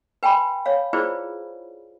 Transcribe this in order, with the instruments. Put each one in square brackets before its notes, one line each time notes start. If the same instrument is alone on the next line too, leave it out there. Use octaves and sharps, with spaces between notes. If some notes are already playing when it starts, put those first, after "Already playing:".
[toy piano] B4 G5 G#5 B5 C6
C#5 F5
E4 F4 G#4 B4 C5 D5